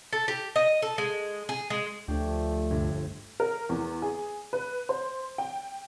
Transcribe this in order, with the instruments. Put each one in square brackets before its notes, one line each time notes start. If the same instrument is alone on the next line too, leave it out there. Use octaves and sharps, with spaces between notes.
[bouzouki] A4
G4
D#5
A4
G#3
G#4
G#3
[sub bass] D2 [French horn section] F3 A3 [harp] D4 G4 C#5
[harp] G1 G#6
[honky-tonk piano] A#4
E2
G#4
B4
C5
G5